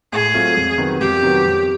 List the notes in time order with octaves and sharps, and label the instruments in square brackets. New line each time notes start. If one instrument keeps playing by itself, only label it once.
[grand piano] A2 [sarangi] G#4
[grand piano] F#3 A3 C4 F4
F2
C3 D#3 F#3 B3
[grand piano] F2 [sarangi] G4
[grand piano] C3 D#3 F#3 B3
F2